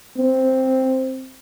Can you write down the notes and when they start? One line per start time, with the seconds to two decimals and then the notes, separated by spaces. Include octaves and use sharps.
0.17 C4